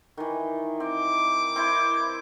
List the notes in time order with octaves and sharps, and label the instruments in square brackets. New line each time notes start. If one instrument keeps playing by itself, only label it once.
[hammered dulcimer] D#3 E3
[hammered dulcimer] C4 [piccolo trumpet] D6
[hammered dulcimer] C4 E4 C5